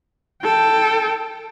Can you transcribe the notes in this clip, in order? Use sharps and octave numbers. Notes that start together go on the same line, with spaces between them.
A4 G5